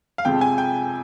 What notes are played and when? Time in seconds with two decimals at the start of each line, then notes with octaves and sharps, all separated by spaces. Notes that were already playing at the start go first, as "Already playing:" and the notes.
0.18 F5
0.25 F2 C3 F3 G#3 G5
0.41 G#5
0.58 G5